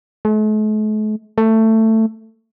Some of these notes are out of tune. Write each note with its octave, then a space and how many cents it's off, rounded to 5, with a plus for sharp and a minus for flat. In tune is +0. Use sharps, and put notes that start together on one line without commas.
A3 -45
A3 +15